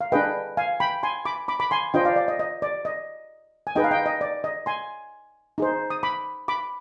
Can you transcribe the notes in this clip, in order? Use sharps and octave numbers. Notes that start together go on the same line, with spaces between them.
F5
D4 G#4 B4 D#5 G5
F5 G#5
G5 B5
G#5 C6
B5 D6
B5 D6
B5 D6
G#5 C6
D4 F4 C5 D#5 G5
D5 F5
D5
D#5
D#5
D5
D#5
G#5
D#4 G#4 B4 D#5 G5
F5
D#5 G5
D#5
D5
D#5
G#5 C6
D#4 G#4 C5
D#6
B5 D6
B5 D6